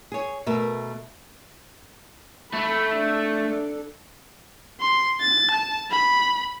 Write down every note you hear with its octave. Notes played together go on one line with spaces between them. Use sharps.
G#4 C#5
B2 A3 A#4 E5
A3 B5
D4 A4
C6
A6
A5
B5